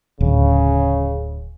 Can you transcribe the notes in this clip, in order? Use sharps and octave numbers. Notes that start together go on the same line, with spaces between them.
D1 C#3